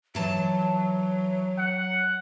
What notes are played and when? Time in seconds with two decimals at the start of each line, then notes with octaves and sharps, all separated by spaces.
0.15 E3 F#3 A5
1.58 F#5